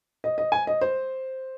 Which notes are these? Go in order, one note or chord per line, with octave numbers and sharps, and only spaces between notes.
D#5
D#5
G#5
D#5
C5